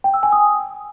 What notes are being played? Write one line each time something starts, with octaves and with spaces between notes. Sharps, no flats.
G5
E6
G#5
D#6